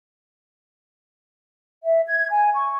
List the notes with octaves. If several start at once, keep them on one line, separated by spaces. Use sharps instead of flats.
E5
G#6
G#5
C#6